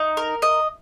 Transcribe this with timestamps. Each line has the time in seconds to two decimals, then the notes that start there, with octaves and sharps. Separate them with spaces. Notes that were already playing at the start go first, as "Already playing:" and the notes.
Already playing: D#4
0.17 A#4
0.42 D#5